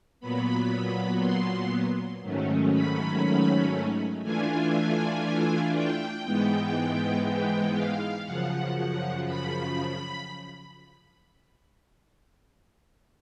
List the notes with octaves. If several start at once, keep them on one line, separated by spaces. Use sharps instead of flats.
A#2 F#3 B3 B5
C6
G#2 D#3 F#3 A3 C#4
B5
E3 A3 D4 F4 G#5
G5
G#2 E3 G#3 B3 G5
G5
F5
F#2 C#3 F3 F#5
B5